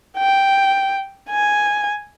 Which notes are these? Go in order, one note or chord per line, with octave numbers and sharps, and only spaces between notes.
G5
G#5